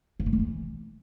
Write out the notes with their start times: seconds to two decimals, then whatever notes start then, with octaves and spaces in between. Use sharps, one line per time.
0.20 G2
0.26 A#2
0.33 G2
0.39 E3